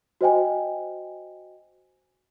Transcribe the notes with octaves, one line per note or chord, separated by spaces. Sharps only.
F#4 C5 D#5 G5 G#5